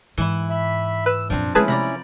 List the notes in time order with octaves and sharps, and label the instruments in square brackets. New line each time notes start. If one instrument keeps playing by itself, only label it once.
[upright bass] G#2 [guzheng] E3 E4
[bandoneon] E5 B5
[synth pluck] B4 [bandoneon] E6
[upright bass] F#2 A#2 [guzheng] F3 C4 [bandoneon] D4
[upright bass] G#3 A3 [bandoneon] C#4 E4 [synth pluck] G#4 B4 A5
[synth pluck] C3 [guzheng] D5 A#5 B5